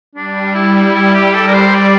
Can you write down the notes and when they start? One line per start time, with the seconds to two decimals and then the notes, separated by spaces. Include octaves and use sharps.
0.15 G3 D4
0.55 E4
0.95 E4
1.14 G4
1.34 A4
1.47 A#4
1.54 C5
1.74 D5